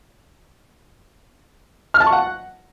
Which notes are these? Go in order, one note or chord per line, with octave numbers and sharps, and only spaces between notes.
F6
A5
C#6
F#5